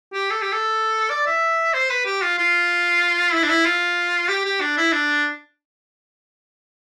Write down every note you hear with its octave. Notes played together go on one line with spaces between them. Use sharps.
G4
A4
G4
A4
D5
E5
C5
B4
G4
F4
F4
E4
D4
E4
F4
G4
G4
D4
E4
D4